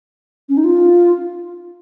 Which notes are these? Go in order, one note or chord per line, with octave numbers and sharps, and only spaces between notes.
C#4
D#4
F4